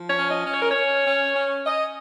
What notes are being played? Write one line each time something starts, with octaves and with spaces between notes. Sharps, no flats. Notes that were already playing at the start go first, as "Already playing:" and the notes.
Already playing: F3
C#5
C#4
D#5
C#4
C#5
A#4
C#4 C#5
C#4
C#4
C#4 D#5